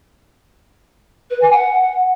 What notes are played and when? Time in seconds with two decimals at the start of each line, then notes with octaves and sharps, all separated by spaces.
1.30 B4
1.41 G#5
1.52 F#5